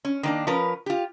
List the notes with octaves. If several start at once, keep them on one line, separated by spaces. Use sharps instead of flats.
C#4
D#3 A#3 D4
F3 C#4 A#4 B4
F4 G4